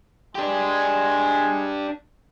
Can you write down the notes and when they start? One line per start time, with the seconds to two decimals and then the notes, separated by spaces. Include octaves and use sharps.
0.35 G#3 D4 G4